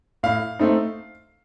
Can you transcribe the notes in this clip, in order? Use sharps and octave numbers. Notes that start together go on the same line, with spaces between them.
A2 F5
A3 C4 D#4